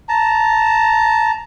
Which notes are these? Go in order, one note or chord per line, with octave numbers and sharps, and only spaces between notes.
A5 A#5